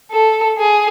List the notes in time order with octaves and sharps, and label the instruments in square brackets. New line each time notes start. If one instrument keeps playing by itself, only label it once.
[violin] A4
G#4